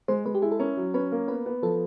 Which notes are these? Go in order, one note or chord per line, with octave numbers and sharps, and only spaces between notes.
G#3 C5
G#3 B4
G4
E4 G#4
A4
C#4 A#4
F#3
C#4 B4
A#3
B3 B4
B3
F3 A4